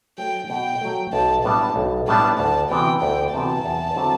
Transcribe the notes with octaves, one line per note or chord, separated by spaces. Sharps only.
F#3 A3 G5
B2 G5
F#3 A3
B1 A5
A2 G3 B3 D4 A5
B1
A2 G3 B3 D4 A5
D2 A5
C3 E3 B3 F#4 G5
D2 G5
C3 E3 B3 F#4 A5
E2
D3 F#3 C4 E4